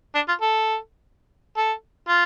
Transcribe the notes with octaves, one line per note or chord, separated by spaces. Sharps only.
D4
F4
A4
A4
F4